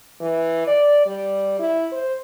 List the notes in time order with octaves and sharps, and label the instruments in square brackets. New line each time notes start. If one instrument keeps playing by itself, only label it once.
[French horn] E3
D5
G3
E4
C5